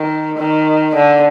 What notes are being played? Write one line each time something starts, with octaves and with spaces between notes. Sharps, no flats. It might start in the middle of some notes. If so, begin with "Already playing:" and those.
Already playing: D#3
D#3
D3